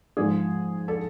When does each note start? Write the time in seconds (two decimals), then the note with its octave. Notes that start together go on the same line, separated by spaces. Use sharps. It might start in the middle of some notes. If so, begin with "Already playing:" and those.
0.17 G#2 F3 G#3 G#4
0.88 A4